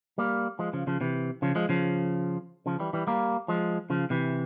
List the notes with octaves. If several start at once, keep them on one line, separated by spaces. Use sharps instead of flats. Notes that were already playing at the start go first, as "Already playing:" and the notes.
G3 A#3
F3 G#3
C#3 F3
C#3 F3
C3 E3
C#3 F3
F3 G#3
C#3 F3
C#3 F3
E3 G3
E3 G3
G3 A#3
F3 G#3
C#3 F3
C3 E3